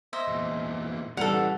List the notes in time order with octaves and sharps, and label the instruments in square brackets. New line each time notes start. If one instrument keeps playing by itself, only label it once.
[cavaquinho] C5 D#5 E5
[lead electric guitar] E2 A#2
[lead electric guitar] C#3 E3 [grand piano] G3 F7 [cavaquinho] A4 F#5